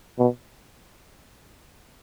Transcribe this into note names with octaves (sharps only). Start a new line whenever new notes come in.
B2